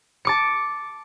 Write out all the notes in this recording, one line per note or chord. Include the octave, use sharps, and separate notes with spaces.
A5 D6 C#7